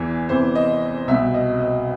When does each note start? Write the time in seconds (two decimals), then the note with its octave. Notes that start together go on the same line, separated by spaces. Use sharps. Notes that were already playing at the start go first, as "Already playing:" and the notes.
Already playing: E2 E3
0.29 E2 C3 E3 C5
0.55 D#5
1.08 C2 E5
1.11 B2
1.34 D#5
1.60 D#5